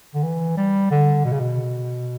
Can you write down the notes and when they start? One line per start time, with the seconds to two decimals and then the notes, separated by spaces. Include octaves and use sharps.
0.14 D3
0.23 E3
0.57 G3
0.91 D3
1.25 B2
1.32 C#3
1.40 B2